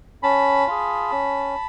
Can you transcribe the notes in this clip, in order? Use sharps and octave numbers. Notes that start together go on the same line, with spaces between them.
C#4 A5 B5
F4 G#4
C#4